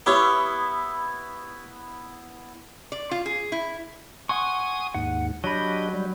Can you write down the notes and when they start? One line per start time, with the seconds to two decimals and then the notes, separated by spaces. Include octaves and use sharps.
0.06 B3 E4 G4 C#5
2.92 D5
3.11 F4
3.26 G#4
3.52 E4
4.29 F#5 G#5 C6 C#6 D#6
4.94 D#2 G#2 F#5
5.44 F#3 D4 G4 D#5 B5
5.94 G3